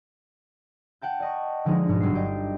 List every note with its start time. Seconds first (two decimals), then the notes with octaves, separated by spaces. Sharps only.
1.02 F#5 G5 A5 G6
1.20 D5 D#5 C#6
1.65 D3 F3 G#3 D#4 G#4
1.88 G#2 B2 B3 D#4
2.00 G1 F#3 G3 C7
2.15 G4 D5 D#5 G5